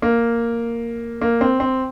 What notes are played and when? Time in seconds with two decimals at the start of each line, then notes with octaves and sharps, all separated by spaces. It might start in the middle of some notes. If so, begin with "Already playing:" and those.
0.02 A#3
1.21 A#3
1.41 C4
1.60 C4